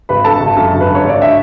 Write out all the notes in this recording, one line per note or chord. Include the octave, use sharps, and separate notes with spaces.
G#1 B4 B5
D3 A4 A5
G#1
F#2
G#1
B4
D3
C#5
G#1 D5
E5